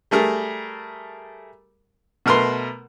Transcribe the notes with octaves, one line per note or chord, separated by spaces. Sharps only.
G3 A3 G#4 A#4
B2 A3 A#4 B4 C6